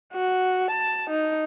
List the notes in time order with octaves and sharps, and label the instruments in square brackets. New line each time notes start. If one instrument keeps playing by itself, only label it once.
[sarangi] F#4
A5
D#4